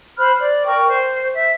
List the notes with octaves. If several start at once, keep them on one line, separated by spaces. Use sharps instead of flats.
C5 B5 F6 F#6
D5
A#4 G5 C#6
C5
E5